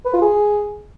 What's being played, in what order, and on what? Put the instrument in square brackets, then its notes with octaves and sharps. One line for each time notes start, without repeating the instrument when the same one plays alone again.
[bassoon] B4
F4
G#4